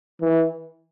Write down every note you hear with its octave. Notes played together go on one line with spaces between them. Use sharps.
E3